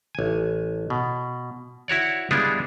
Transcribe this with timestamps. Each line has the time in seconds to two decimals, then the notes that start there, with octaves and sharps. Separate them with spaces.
0.15 A1 G#5
0.90 B2
1.88 E4 F#4 C#5 D5
2.31 G3 G#3 B3 D4 E4 F4